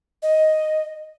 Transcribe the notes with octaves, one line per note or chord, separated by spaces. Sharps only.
D#5